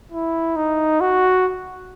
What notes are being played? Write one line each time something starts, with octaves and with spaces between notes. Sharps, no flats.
E4
D#4
F#4